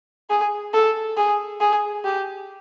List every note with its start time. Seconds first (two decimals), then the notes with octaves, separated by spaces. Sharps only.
0.30 G#4
0.73 A4
1.17 G#4
1.60 G#4
2.04 G4